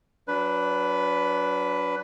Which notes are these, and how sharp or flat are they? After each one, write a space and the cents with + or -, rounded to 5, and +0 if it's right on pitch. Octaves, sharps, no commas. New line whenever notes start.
F#3 +0 D4 -25 B4 +5